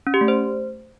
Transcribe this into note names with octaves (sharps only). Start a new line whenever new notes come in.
C#4
G4
A3
C5